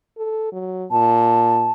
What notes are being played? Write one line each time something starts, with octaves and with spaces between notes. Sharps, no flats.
A4
F#3
A#2 A5